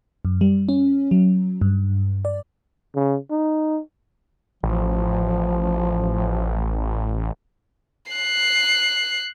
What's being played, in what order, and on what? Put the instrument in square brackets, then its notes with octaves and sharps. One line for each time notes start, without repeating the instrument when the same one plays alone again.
[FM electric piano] F#2
G3
C#4
F#3
G2
D5
[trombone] C#3
D#4
[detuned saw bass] A1 [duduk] F3
[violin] F#6 C7